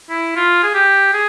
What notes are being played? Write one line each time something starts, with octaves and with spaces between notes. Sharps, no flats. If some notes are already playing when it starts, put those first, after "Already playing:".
E4
F4
G#4
G4
G#4